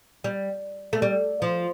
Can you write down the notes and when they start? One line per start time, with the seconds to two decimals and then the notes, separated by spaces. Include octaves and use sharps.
0.24 G3
0.93 A3
1.02 G3
1.42 F3